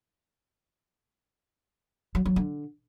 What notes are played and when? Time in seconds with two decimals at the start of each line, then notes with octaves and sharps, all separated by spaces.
2.15 F#3
2.26 F#3
2.36 D3